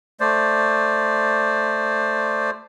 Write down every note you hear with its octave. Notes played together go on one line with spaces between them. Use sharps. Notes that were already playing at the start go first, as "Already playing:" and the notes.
A3 C5 D5